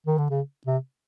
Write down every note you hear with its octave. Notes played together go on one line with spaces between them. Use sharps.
D#3
D3
C#3
C3